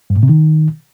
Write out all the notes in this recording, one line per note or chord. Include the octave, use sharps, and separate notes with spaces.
G2
A2
C3
D#3